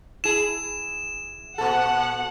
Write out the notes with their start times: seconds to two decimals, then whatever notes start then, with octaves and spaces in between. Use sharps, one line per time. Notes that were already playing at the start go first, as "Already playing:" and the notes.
0.24 E4 G#4 E7
1.58 A#2 A4 F#5